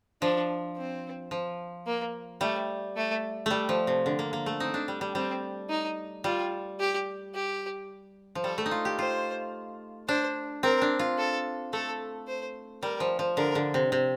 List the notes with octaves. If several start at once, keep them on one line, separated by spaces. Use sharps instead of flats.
F3 D4
C4
F3
A#3
G3 A3
A3
G3 A3
F3
C3
D3
A#3
A#3
A3
C4 D#4
D4
G3
G3
G3 C4
D#4
G3 F4
G4
G4
F3
G3 A4
A3
D#4
F4
G4
F4 C5
D4 C5
C4 A#4
D4
F4
A4
A3 A4
C5
G3 A#4
F3
F3
D3 A#4
D3
C3
C3